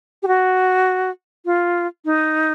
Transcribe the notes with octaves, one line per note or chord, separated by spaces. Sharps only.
G4
F#4
F4
D#4